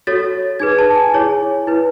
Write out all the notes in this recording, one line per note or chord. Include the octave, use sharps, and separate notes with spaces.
F#4 A4 C#5 A6
D#4 G#4 B4 G#6
A5
G#5
E4 G#4 C#5
E4 B4